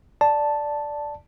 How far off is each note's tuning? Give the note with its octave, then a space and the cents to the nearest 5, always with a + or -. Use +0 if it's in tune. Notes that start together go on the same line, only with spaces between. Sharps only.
D5 +0 A5 +0